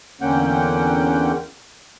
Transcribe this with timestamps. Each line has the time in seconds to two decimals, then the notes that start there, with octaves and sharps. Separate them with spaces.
0.21 E2 D3 A#3 C#4 F#5 G5